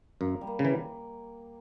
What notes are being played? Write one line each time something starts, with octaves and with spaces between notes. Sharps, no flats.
F#2 A#3
G3
A#3
C#3
E3